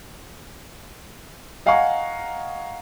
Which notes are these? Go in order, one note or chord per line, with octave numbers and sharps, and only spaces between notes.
D#5 F5 F#5 G#5 A#5 C#6